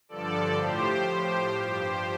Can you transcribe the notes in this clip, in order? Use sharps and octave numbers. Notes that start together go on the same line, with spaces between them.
G2 D3 F3 A4 D5
A2 F3 G4 C5
A2 F3 G4 C5
G2 F3 G4 C5